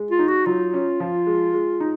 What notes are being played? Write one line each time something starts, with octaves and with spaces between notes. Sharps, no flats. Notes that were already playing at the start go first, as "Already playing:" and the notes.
Already playing: G#3
F4
D#4
F#4
F#3 F4
C#4
F3
G#3
G#3
D#4